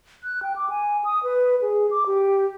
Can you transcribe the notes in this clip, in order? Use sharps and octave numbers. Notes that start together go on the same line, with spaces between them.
F#6
G5
D6
G#5
D#6
B4
G#4
D6
G4